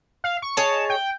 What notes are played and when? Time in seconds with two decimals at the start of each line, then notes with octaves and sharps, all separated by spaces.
0.24 F5
0.42 C#6
0.57 G#4 C#5 D#5 A5
0.90 G5